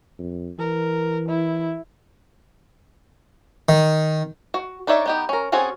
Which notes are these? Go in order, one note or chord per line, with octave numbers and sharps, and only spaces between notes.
F2
E3 A#4
E4
D#3
F#4
D4 D#4 C#5 D5 E5
B3 D#4 G4
C#4 A#4
C4 C#4 F#4 G#4 A4